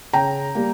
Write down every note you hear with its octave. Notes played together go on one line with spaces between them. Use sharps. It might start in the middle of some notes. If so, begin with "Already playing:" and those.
C#3 G5 A#5
G3 A#3